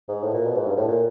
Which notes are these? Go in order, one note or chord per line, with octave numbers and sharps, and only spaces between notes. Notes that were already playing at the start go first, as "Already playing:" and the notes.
G#2
A2
A#2
B2
G#2
G2
A2
A#2